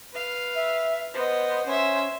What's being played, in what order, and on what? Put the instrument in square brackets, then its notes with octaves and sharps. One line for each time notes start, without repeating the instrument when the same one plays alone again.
[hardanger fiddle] B4 F5
[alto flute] E5
[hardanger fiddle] B3 D#5 [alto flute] C5
[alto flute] C#4 [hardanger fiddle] C5 E5